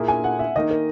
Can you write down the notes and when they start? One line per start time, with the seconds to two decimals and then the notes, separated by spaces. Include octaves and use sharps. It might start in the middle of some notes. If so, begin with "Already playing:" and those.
Already playing: A#2 A#3 E4 G#4
0.08 G#5
0.24 F#5
0.39 E5
0.56 D#3 A#3 D#4 D#5
0.71 A#4